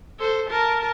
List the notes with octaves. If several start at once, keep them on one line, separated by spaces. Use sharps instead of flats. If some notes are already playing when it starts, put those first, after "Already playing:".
A4 C5
A#4 A5